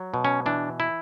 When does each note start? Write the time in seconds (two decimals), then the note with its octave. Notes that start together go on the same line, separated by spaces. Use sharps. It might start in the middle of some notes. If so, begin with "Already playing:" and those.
Already playing: F#3
0.14 B2
0.25 C#4
0.46 E3 D4
0.80 E4